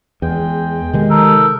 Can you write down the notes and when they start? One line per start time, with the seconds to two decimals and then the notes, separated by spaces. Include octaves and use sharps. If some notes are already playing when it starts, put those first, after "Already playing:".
0.22 E2 G#3 G5
0.93 C3 D#3 G#3
1.10 D#4 A4 A#4